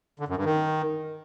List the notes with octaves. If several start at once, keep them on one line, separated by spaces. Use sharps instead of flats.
D3
F#2
G2
D#3